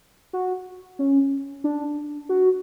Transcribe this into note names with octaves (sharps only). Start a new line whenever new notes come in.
F#4
C#4
D4
F#4